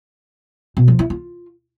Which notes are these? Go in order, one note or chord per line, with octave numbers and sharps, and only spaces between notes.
B2
F3
E4
F4